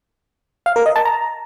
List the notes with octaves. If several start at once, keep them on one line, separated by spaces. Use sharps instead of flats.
F5
A#4
D#5
A5
A#5